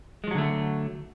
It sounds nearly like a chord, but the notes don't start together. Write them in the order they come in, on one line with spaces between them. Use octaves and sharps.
G#3 F3 F#3 D3 A3